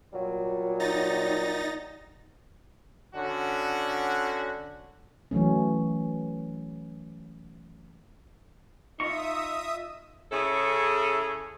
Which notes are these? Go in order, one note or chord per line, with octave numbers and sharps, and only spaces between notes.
A#2 F#3 G3
D#4 A6 A#6
D3 C#4 F#4
E3 F#3 A3 C#4
D#4 F4 D#5 E5 C#6 D#6
C#3 C#4 E4 G#4 A4 C#5